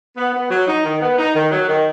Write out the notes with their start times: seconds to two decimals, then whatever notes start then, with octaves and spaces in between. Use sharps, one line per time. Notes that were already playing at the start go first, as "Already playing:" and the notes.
0.17 B3
0.33 B3
0.51 F#3
0.67 D#4
0.85 D#3
1.02 B3
1.18 D#4
1.35 D#3
1.51 F#3
1.68 D#3